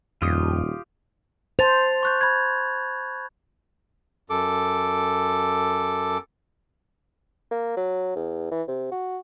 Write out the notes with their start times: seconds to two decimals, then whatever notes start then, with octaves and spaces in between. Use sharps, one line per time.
0.22 D#1 F2 F4 G4 D#6
1.59 C5 A5 A6 F7
2.03 C#6 F#6 G6
2.21 B5 G#6
4.30 F#2 A4 D6
7.51 A#3
7.77 F#3
8.16 E2
8.51 E3
8.68 C3
8.92 F#4